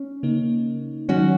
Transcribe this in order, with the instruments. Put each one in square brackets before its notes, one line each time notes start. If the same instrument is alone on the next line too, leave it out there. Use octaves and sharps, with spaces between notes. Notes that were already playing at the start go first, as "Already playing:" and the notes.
Already playing: [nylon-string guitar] C#4
[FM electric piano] C#3 A#3 D#4
[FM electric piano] D#3 F#3 D#4 [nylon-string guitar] C#4 F#4